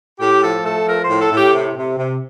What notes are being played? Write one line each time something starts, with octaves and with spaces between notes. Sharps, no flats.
A2 G4
F3 A4
A3 A4
F3 A#4
C5
A2
A4
A2
G4
C3
C3
C3